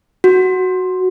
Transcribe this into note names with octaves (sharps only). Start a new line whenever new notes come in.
F#4